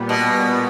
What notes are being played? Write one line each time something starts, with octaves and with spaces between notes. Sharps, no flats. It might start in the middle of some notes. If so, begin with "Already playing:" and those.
Already playing: A#2 G3 B3
B2